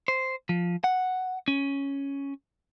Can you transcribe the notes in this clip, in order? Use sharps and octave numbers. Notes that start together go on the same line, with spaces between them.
C5
F3
F#5
C#4